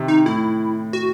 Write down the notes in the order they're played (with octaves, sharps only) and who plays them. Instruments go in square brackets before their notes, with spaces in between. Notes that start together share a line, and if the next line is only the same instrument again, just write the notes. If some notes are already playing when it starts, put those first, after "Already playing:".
Already playing: [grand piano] C3 D#3
[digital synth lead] D#4
[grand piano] A2 [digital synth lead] E4
[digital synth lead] F#4